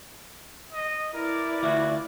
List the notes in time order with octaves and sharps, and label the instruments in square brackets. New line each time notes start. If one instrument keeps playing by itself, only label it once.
[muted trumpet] D#5
[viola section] E4 B4 D5 [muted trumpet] A#4
[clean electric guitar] D2 F4 E5 [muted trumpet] F#4